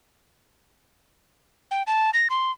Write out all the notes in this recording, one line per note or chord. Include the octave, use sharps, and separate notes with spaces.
G5
A5
A#6
C6